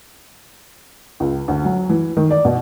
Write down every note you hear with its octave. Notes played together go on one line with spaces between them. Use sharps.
C#2
D2
F#3
E3
D#3
D5
B2